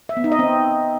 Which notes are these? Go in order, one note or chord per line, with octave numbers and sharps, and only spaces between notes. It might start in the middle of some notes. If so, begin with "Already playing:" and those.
E5
B3
D#4
D#5
C4